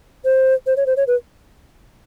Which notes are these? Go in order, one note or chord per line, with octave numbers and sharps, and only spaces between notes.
C5
C5
C#5
C5
C#5
B4